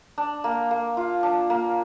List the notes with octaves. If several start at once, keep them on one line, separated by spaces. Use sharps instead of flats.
D4
A#3
A#3
F4
D4
A#3